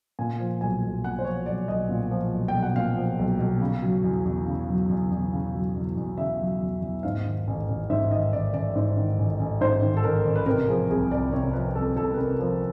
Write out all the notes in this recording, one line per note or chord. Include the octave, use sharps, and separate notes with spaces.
A#2 G#5
F3
B1 G#5
B1
A#2 F#5
C5
F3 C#5
B1 D5
B1 D#5
A#2
F3
B1
G5
B1
F#5
A#2 F5
F3
B1
B1
C#3
F#3
E2
E2
C#3
F#3
E2
E2
C#3
F#3
E2
E2
C#3 E5
F#3
E2
E2
G#2 F5
D#3
A1
A1
G#2 E5
D#3 D#5
A1 D5
A1 D5
G#2
D#3
A1
A1
G#2 C5
D#3
A4
A1 A#4
A1
B4
C3 A#4
F3 G#4
C2 G#4
C2 D5
C3 C#5
F3 B4
C2 A4
C2 A4
B4
C3 A#4
F3 A#4